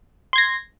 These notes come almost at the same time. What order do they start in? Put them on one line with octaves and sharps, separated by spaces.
C6 G#6 A#6